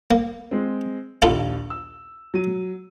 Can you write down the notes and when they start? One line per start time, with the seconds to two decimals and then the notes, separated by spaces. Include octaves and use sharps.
0.11 A#3
0.51 G#3 C4
1.22 A#1 D#2 E4 F4 A4
1.70 E6
2.34 F#3 D#7